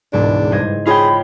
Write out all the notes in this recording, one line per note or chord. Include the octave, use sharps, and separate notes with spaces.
E1 C#2 G#2 D4
G2 C5 D#5 G#6
F4 G#4 C#5 G5 B5